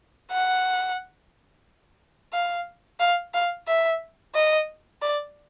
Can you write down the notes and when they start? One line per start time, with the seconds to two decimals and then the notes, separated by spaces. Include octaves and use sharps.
0.31 F#5
2.33 F5
3.00 F5
3.34 F5
3.67 E5
4.35 D#5
5.02 D5